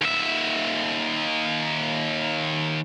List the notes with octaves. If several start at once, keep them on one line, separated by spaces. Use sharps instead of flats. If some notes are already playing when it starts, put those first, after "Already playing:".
D#2 E5